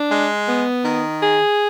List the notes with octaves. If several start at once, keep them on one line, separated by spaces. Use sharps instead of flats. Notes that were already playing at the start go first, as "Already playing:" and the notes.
Already playing: D4
G#3
B3
D#3
G#4